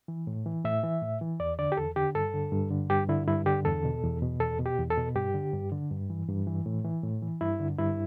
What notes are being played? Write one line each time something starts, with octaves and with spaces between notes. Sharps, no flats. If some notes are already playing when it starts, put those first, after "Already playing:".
E3
A2
E3
A2 E5
E3
A2
E3
E2 D5
D3 D5
G4
E2 A4
D3 G4
G2 A4
D3
G2
D3
G2 G4
D3 E4
G2 E4
D3 G4
E2 A4
B2
E2
B2
E2 A4
B2
G4
E2
A4
B2
G2 G4
D3
G2
D3
G2
E3
G2
E3
A2
E3
A2
E3
G2 E4
D3
G2 E4